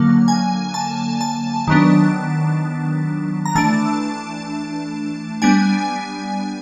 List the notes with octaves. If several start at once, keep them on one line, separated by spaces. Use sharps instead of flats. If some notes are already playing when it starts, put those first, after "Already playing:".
Already playing: D3 F#3 A#3
G#5
A5
A5
D#3 F#3 B3 D4
A#5
E3 A3 D4 A5
G3 B3 D4 G#5